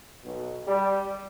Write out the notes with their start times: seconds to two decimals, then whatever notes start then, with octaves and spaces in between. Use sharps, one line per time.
0.24 B1 B2
0.67 G3